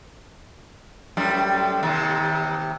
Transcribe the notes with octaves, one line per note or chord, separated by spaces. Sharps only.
F#2 A2 G3
D#2 C3